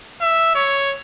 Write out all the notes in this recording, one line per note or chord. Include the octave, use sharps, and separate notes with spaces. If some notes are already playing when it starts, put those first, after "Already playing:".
E5
C#5